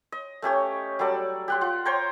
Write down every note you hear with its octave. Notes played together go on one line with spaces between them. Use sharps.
D#5
A3 C#4 G4 C#5
F#3 G3 A4 D5
G4 F#5 C6
F4 F#5
C5 C#5 G5 A#5